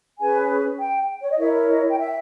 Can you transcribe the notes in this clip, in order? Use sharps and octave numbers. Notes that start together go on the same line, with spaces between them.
C#4 G#4 B4 G#5
G5
C#5
D#5
E4 A#4 C#5 E5
D#5
G5
E5